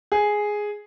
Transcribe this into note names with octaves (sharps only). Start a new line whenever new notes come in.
G#4